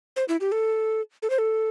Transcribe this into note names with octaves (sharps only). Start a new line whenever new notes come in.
C5
E4
G4
A4
A4
C5
A4